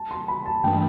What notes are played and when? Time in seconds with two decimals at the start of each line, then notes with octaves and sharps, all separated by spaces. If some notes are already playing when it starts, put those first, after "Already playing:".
Already playing: A5
0.11 C6
0.28 B5
0.46 A5
0.64 G2 E3 A3 D4 G5